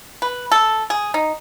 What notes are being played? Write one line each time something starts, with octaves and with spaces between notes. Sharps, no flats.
B4
A4
G#4
D#4